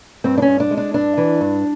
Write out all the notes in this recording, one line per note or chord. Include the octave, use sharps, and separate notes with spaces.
G2 C4
D4
C#4
G2
D4
G#3
D4
G2 D4
E3
G2